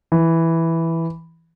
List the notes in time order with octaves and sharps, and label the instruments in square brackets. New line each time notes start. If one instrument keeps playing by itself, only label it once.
[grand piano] E3